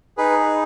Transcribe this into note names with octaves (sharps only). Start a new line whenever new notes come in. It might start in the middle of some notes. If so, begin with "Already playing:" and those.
D#4 G#4 B4